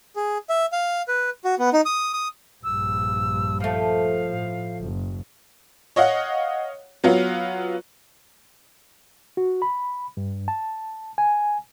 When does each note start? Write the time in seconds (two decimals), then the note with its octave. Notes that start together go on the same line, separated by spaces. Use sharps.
0.16 G#4
0.50 E5
0.72 F5
1.08 B4
1.45 F#4
1.59 B3
1.73 D#4
1.86 D#6
2.13 D#6
2.64 A#1 G2 E6
3.60 F3 A3 F5
4.27 A2
4.80 F#1
5.96 C#5 D#5 F5 F#5
7.04 F#3 B3 F4
9.37 F#4
9.62 B5
10.17 G2
10.48 A5
11.18 G#5